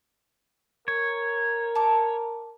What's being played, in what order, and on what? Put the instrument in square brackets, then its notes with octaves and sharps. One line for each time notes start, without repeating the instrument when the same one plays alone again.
[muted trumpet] A#4 [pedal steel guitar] C#5
[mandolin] A5 D6